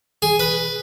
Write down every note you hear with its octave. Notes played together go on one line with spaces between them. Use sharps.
G#4
B4